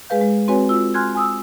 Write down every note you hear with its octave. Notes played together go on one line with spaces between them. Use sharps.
G#3 G#4 B4 F5 G6
G#3
C4 F#4 B4 C#5 G#5
F4 E6
G#5 C6 F6 F#6 G#6
G#5 D#6 E6